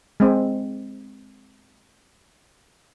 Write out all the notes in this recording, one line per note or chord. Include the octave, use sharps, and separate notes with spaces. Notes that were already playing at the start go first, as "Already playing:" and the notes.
G#3 C4